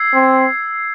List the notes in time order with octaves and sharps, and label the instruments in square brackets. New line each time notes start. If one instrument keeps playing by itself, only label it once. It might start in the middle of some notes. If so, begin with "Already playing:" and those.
Already playing: [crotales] E6 G#6 C7
[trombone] C4